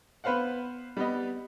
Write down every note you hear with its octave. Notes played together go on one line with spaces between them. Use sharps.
B3 B4 C5 F5 F#5
G3 B3 D#5